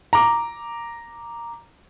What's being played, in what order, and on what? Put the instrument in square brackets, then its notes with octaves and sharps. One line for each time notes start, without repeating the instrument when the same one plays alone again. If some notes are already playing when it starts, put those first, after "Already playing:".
[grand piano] A#5 D6